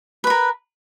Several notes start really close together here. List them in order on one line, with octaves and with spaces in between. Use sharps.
B4 B5 A#4